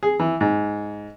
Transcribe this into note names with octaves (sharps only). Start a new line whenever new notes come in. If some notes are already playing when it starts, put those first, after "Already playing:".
G#4
E3
G#2